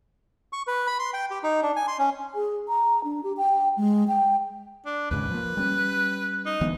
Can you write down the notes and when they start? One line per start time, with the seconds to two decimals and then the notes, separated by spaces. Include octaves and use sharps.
0.53 C#6
0.67 B4
0.87 B5
0.99 C6
1.14 G5
1.31 G4
1.43 D#4
1.63 D4
1.76 G#5
1.87 C6
1.99 C#4
2.35 G#4
2.68 A#5
3.04 D4
3.24 G4
3.37 G5
3.77 G#3
4.08 G5
4.86 D4
5.11 D#2 G#2 C#3 B4
5.30 F3 A#3
5.57 G3 C#4
6.45 D#4
6.61 D2 E3 B3